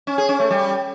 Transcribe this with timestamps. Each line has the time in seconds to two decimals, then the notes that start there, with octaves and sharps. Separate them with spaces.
0.07 C#4
0.18 G#4
0.29 C#4
0.40 A3
0.51 G3